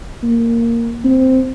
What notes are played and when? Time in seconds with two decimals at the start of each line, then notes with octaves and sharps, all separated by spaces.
0.23 A#3
1.04 C4